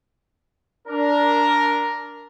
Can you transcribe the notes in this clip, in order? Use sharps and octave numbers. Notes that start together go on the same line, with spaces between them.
D4 A#4